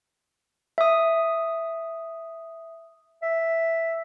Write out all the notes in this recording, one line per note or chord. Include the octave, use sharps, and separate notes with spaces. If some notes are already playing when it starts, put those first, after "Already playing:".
E5 D#6
E5